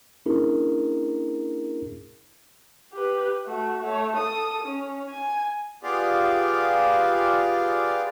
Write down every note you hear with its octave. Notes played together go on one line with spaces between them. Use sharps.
A#3 C#4 D4 E4 G#4 A#4
G4 B4
A3 F#4
A3 C#5
A4 D#6
C#4
G#5
B3 F4 G4 G#4 D5 F5